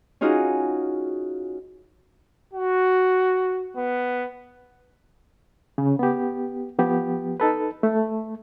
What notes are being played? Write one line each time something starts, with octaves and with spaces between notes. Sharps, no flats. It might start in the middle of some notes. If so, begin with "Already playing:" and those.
C#4 D#4 F4 F#4 G#4
F#4
B3
C#3
B3 G4
F3 B3 G4
D#4 A4 B4
A3